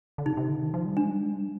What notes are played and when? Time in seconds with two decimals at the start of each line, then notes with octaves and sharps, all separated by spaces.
0.18 D3
0.26 C3 D#4
0.37 C3
0.49 D3
0.61 D#3
0.74 F3
0.86 G3
0.97 G#3 D4
1.09 G3
1.20 G#3
1.33 G3